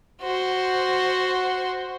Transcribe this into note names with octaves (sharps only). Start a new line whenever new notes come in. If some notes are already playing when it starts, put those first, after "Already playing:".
F#4 C5